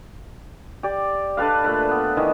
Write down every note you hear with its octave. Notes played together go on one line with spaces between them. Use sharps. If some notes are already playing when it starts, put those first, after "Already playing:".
G4 D5
D4 A4 B4 F5
A#2 A3 B4
B3
D#3 E3